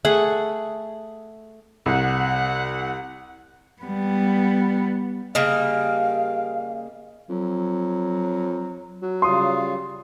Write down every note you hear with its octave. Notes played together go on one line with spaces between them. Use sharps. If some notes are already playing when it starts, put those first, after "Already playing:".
A3 G#4 F#5
C2 F#5
G3 B3
C#3 G3 A#3 D#5 F5
F2 F#3
F#3
C#3 G3 F4 C6 D#6